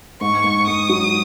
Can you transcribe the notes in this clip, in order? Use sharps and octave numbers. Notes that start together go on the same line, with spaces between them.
G#2 C#6
G#2
G#2 D#6
F#3